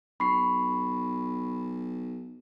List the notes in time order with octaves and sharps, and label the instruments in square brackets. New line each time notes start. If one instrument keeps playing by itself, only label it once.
[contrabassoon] B1 [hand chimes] B5 C#6 C7